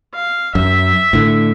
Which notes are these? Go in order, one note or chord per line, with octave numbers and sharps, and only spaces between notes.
F5
F#2 E5
A2 D3